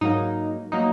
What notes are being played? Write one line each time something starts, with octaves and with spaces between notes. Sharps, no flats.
G#2 F#3 A#3 D#4
F#3 A#3 D#4